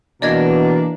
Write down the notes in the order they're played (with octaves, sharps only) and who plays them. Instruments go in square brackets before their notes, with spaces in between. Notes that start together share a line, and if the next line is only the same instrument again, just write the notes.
[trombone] B2 [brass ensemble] E3 [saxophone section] A#3 D4 [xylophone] D5 D#5 G#6